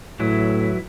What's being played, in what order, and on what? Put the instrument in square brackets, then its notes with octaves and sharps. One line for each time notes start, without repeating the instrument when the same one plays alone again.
[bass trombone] A2 [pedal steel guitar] E3 F#3 E4